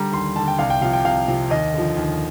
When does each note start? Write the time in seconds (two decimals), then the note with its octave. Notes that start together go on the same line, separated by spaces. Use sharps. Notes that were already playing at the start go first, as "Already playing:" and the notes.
Already playing: D3 G3 A#5
0.12 D#2 C6
0.36 D3 G3 A5
0.48 G5
0.58 C2 F5
0.70 G5
0.81 C3 F3 F5
0.93 G5
1.05 C2 F5
1.28 C3 F3
1.50 D#2 D#5
1.73 D3 F3
1.97 D#2